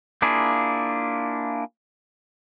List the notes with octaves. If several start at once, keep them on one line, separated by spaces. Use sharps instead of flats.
A#3 D4 E4 F4 G#4